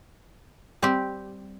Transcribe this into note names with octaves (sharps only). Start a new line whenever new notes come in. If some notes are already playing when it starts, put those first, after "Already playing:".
G3 C4 G4